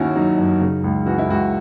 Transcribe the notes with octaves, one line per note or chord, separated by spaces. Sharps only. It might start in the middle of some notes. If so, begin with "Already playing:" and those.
Already playing: D#2 D#3 C#4 E4 F#4
F#3 D#4
F#2
C#3
C#2
E3 F#4
E4
C#2 F#4